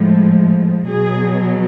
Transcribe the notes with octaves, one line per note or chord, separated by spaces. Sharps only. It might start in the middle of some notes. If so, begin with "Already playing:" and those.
Already playing: A2 F3 G#3
B2 F#3 G#4